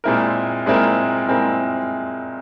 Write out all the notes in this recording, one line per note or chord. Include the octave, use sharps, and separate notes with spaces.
A#2 G#3 C4 E4 A#4
A#2 G#3 C4 E4 A#4
A#2 G#3 C4 E4 A#4